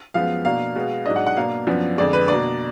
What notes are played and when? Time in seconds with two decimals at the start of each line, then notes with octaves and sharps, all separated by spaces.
0.14 F#2 F3 G#3 B3 F5
0.45 B2 A#3 D4 F5
0.75 B2 G#3 B3
1.06 G#2 F#3 D4 D#5
1.16 F#5
1.26 F#5
1.37 B2 A#3 D4 F5
1.67 F#2 F3 B3 D4
1.97 F2 D3 G#3 D5
2.13 B4
2.28 B2 A#3 D4 D5